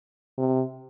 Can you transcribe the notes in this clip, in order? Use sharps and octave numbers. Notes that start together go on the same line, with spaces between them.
C3